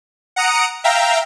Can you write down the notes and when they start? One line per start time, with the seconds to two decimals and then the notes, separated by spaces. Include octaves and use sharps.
0.36 F#5 A#5 D#6 C#7 D7
0.84 E5 F5 G5 A#5